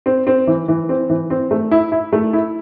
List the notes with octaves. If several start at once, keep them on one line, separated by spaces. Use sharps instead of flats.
C4
C4
E3
E3
C4
E3
C4
A3
E4
E4
A3
E4